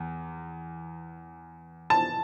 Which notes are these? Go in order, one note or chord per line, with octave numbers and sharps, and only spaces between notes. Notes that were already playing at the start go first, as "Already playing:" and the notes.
Already playing: E2
A5